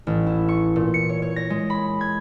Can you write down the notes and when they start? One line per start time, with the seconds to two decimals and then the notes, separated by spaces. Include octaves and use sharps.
0.07 A1
0.26 E4
0.49 C#6
0.76 A#2
0.94 C#7
1.09 C#5
1.22 C#5
1.36 A#6
1.50 G#3
1.70 B5
2.01 G#6